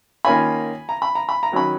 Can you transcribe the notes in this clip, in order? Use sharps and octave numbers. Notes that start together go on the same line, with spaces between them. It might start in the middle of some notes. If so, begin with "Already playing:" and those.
D#3 A#3 C#4 F4 G#5 B5
A#5
B5
A#5
B5
A#5
D#3 F#3 C#4 B5